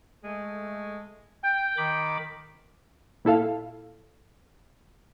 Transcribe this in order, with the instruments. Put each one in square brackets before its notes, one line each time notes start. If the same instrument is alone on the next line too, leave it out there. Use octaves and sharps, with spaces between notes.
[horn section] G#3 A3
G5
[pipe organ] D#3 B5 D6
[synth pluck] A#2 E4 A4 F5